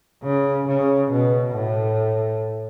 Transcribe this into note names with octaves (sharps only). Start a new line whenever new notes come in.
C#3
C#3
B2
A2